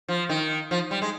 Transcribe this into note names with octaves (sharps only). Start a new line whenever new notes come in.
F3
D#3
F3
G3
G#3